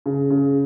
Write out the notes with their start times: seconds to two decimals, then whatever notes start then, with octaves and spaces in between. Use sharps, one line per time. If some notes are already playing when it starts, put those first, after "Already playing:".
0.06 C#3
0.30 C#3